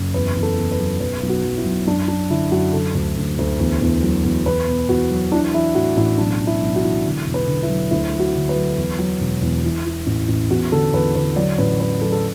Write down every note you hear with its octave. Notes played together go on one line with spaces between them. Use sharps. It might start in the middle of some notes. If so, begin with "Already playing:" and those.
Already playing: F#1
E2 B4
E2
A4
E2
B4
F#3
B1 B4
B1
F#4
F#3
E4
B1
F#2 D4
F#3 D4
D3 E4
F#2 F#4
D3 A4
D2
D2
D2
E2
E2
F#3
E2
E2 B4
B2
E2 F#4
F#3
E3 D4
E3 E4
A2 F#4
A1 E4
B1 D4
E3
E4
B1
F#4
E3
D3
E1
B4
D3
E4
F#3
D2 E4
F#3
F#4
D3
B4
F#3
E2
F#3
E1
E2
E3
E3
A1
A1
E2 F#4
D3 A4
E2 B4
D3 B4
F#3 D5
A1 B4
F#3 B4
F#3 A4
A4